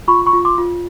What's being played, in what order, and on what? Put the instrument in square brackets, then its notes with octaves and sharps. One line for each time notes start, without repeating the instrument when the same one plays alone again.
[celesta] F4 B5 C#6
B5 C#6
F4
C6 D6
F4